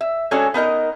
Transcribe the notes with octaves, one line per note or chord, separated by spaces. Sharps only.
E5
G#3 C#4 D4 F#4 A4 C#5
B3 D#4 A#4 D#5